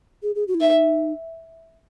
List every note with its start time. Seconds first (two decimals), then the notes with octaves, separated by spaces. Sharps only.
0.23 G#4
0.35 G#4
0.48 F#4
0.55 E4
0.60 D#4 E5